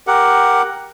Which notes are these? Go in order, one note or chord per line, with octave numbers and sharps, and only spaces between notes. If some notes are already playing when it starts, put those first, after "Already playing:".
G4 A#4 F#5